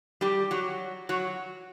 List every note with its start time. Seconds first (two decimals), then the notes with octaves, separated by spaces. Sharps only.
0.21 G3 G4
0.51 F#3 F#4
1.09 F#3 F#4